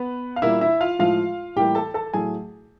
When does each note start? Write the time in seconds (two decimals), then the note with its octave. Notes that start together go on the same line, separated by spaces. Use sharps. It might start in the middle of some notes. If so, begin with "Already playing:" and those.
Already playing: B3 B4
0.36 F5
0.42 A#2 G3 A#3 E4 E5
0.61 E4 E5
0.81 F4 F5
0.99 A2 F3 G#3 F4 F5
1.56 A2 E3 G3 A#3 G4 G5
1.75 A4 A5
1.94 A4 A5
2.14 A2 F#3 A3 G#4 G#5